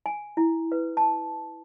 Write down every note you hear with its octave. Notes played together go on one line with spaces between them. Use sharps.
G#5
E4
B4
A5